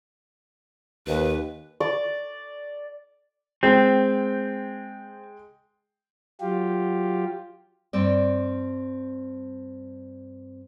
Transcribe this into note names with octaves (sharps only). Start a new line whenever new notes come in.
D#2 B4
D5 D6
G#3 C4 G5
F#3 F4 G4
G2 C4 D5